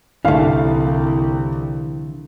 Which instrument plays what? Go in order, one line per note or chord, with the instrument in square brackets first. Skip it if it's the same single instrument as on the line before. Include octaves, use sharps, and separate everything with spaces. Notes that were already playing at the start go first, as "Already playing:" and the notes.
[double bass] C2 [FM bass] D3 [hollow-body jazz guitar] E3 A3 [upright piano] F5